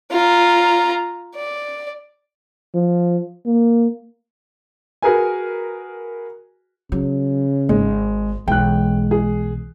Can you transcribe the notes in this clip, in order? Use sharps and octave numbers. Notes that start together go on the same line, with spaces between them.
F4 A#5
D5
F3
A#3
F#4 G#4 A#4 B4 G#5
C#3 F#3
G#1 G#3
B1 E3 G#3 G5 F#6
G#4